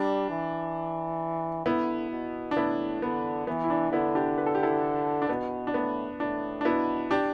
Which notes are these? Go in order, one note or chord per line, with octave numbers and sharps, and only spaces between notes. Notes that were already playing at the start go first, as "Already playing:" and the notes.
Already playing: G3 D4
E3
D3 B3 E4
B2
D4
A2 B3 E4
D3 B3
E3 B3
E4
D4
D3 B3 E4
D4 G4
B4
A4
G4
E4 A4
D4
B2 B3
D4
A2 B3
A2 D4
D4
B2 B3 E4
D4 G4